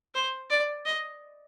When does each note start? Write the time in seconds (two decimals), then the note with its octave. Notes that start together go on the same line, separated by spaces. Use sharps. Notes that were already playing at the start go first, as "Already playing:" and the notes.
0.15 C5
0.50 D5
0.86 D#5